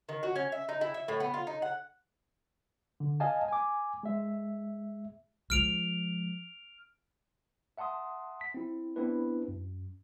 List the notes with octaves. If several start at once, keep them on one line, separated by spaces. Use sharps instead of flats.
D#3
F#4
C#4
E5
D#4
E4
E5
A2
B3
F4
D#4
F#5
D3
D#5 F5 G#5 A5
G#5 D6
G#3 E5
F3 G#3 F6 D7 F7
E5 F#5 A5 C6 D#6
B6
C4 E4
B3 C4 D4 E4 B4
F#2